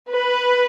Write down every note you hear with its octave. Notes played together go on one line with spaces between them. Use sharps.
B4